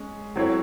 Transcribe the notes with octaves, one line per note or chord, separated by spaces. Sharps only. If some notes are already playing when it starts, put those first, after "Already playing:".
Already playing: G#3 C#4
F#3 C4 E4 A4 C#5